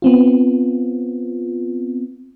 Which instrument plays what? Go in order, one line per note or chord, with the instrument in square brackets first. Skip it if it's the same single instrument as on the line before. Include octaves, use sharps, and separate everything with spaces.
[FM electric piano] B3 C4 F4